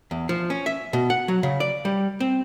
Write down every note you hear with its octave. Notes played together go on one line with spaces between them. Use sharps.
E2
F3
C#4
E5
B2
F#5
F#3
C#3
D5
G3
C4